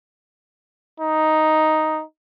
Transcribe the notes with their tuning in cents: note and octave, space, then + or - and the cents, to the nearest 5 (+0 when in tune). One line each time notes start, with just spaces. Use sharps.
D#4 +5